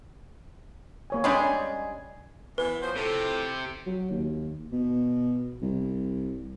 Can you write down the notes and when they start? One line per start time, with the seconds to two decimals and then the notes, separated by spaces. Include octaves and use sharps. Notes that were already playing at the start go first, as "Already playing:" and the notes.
1.10 A#3 C#5 G#5
1.24 G3 G#3 C#4 D4 G#4 C#5
2.58 E3 B3 B4
2.82 F3 F#3 C5
2.96 A2 C3 F3 G4 A4
3.86 F#3
4.10 D#2
4.72 B2
5.62 C2